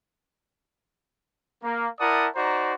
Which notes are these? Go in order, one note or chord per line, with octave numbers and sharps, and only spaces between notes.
A#3
E4 A#4 D5 F#5 A5 D#6
D#4 F#4 C5 D5 A#5